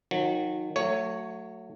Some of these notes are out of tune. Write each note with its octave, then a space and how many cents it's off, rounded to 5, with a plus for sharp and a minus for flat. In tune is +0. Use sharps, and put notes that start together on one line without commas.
D#3 +0 F#3 -35
F#3 +0 A3 +30 C#5 +0